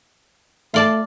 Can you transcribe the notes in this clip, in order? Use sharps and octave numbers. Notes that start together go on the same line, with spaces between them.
A3 F4 D5 A5